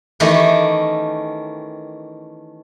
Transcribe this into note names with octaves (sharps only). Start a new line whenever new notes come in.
D#3 E3 A3 C#4 D#4 G4